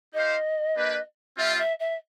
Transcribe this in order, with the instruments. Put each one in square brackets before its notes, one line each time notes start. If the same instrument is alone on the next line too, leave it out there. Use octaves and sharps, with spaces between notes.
[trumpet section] D#4 G4 C5 F5 [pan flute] D#5
[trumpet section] A#3 D4 G4 B4
[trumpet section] G3 C4 F4 [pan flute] E5
[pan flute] E5
E5